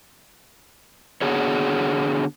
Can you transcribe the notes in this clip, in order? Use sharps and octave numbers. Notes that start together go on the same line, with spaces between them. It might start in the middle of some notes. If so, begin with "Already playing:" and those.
D3 B3 D4 F#4 G#4 C#5